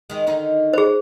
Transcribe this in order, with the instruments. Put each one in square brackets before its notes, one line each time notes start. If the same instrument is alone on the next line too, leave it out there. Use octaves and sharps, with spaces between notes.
[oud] D#3 G#3
D3 D#3 D#4
[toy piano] G#4 C5